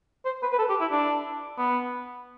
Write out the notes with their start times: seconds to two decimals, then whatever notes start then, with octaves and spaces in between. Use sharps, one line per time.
0.25 C5
0.42 B4
0.52 B4
0.59 A4
0.69 G4
0.81 E4
0.91 D4
1.58 B3